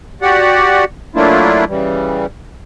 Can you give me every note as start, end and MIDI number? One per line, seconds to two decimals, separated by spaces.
0.22 0.85 66
0.22 0.85 67
0.22 0.85 74
0.22 0.85 78
1.15 1.65 54
1.15 1.65 57
1.15 1.65 58
1.15 1.65 62
1.15 1.65 64
1.15 1.65 65
1.68 2.26 49
1.68 2.26 52
1.68 2.26 55